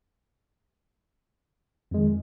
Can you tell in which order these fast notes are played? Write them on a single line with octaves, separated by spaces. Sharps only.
F2 G#3 D#3